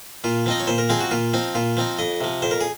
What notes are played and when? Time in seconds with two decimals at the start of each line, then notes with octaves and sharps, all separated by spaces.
0.24 A#2 F4
0.46 F3 C4 D#4 D#5
0.60 C#5
0.67 A#2 C5
0.78 A#4
0.89 F3 C4 D#4 G#4
1.00 F#4
1.11 A#2 F4
1.34 F3 C4 D#4
1.55 A#2 F4
1.77 F3 C4 D#4
1.99 F2 D#5
2.21 C3 F3
2.42 F2 C5
2.51 A#4
2.61 G#4